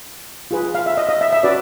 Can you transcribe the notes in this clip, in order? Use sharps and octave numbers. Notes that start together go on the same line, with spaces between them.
F4 G#4 B4
F5
E5
D#5
D#5
E5
E5
C#4 F#4 B4 D5